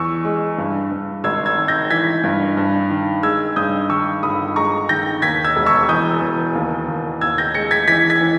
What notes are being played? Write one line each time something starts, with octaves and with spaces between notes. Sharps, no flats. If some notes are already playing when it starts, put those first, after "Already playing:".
Already playing: E2 C#6 E6
G#3
G2
G2
G#1 E6 G#6
E6 G#6
D#3
G6 A#6
E3 G#6 B6
G2
G2
D#3
G#3 E6 G#6
G2 D#6 G6
D#3 C#6 E6
G1 B5 D#6
G#3 A#5 C#6
D#3 G6 A#6
D#2 G#6 B6
E6 G#6
E1
C#6 E6
E2 D#6 G6
E2
D#2
D#2
D#2 E6 G#6
G6 A#6
G#3 A#6 C#7
G#6 B6
E3 G#6 B6
G#6 B6
E3